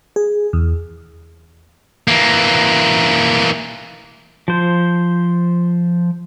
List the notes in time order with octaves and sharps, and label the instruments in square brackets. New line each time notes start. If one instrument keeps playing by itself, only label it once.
[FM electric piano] G#4
E2
[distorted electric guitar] E3 A#3
[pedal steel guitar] F3 C5